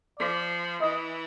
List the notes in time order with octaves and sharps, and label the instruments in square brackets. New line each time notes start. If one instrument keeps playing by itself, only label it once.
[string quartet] F3 [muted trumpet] D5
[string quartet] E3 [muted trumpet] D#5